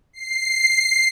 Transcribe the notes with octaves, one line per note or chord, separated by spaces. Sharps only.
C7